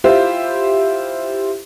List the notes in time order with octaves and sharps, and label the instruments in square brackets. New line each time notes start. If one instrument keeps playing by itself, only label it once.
[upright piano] E4 F4 G4 C5